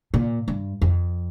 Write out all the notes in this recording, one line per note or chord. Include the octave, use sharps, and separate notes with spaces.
A#2
G2
F2